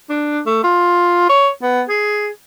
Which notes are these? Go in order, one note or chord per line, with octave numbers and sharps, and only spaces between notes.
D4
A3
F4
C#5
B3
G#4